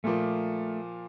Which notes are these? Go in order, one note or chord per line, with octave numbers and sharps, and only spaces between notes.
A#2 F3 A3 A#3